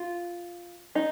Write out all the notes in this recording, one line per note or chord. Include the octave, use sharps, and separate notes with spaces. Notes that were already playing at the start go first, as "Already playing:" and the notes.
Already playing: F4
D#4